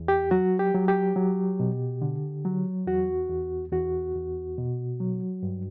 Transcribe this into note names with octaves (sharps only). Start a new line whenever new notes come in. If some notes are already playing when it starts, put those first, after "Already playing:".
Already playing: E2
G4
F#3 F#4
G4
F#3
G4
F#3
B2
D3
F#3
E2 F#4
E2
E2 F#4
E2
B2
F#3
G2